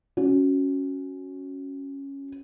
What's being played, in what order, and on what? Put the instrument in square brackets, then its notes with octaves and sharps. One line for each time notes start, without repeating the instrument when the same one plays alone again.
[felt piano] C#4 F#4